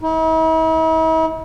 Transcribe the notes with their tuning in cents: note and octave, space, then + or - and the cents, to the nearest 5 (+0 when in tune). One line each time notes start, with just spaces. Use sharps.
E4 -45